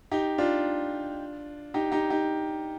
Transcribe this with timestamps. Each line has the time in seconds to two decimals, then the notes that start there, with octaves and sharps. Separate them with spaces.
0.12 D#4 G4
0.38 D4 F4
1.74 D#4 G4
1.92 D#4 G4
2.10 D#4 G4